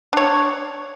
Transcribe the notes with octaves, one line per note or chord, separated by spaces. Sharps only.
D4 C#5